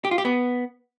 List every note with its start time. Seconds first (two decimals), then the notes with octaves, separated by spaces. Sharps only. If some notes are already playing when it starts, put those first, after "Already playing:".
0.05 G4
0.11 F4
0.18 G4
0.25 B3